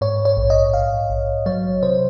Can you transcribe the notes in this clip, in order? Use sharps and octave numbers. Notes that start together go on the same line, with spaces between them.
G#2 C#5
C#5
A#1
D#5
A#1 F5
A#1
F#3 C#5
C3 C5